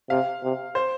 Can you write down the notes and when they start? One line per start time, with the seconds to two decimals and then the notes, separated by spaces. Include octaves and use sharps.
0.10 C3 F5
0.43 C3
0.75 C5